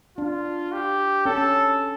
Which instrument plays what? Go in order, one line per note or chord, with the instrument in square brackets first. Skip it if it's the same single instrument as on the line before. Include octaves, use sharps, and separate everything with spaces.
[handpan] D4 [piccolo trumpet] F4
[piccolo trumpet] G4
[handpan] C#4 [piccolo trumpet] A4